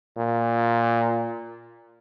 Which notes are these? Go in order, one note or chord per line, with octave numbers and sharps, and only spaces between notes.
A#2